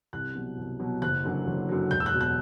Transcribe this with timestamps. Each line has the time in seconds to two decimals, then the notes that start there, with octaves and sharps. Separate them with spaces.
0.13 C2 F#6
0.35 B2 F#3
0.58 C2
0.80 B2 F#3
1.02 F#1 F#6
1.24 F#2 D3 F#3
1.47 F#1
1.69 F#2 D3 F#3
1.91 E1 G6
2.00 E6
2.06 F#6
2.13 B2 F#3
2.21 F#6